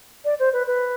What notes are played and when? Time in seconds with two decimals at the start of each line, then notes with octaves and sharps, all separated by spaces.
0.24 D5
0.39 C5
0.53 B4
0.67 B4